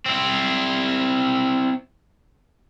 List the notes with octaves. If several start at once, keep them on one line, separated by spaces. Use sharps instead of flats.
C4 E4